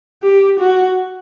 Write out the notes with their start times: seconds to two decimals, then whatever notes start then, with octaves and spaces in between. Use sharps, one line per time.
0.23 G4
0.60 F#4